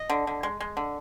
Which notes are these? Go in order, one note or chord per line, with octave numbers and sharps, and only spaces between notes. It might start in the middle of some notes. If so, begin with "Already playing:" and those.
Already playing: D#5
D3
D3
G#3
G#3
D3